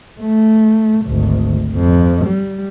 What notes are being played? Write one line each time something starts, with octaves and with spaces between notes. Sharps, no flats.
A3
G#1 D2
F2
G3